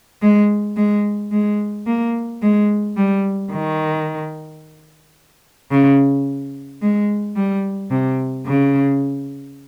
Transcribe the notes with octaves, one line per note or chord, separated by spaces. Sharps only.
G#3
G#3
G#3
A#3
G#3
G3
D#3
C#3
G#3
G3
C3
C#3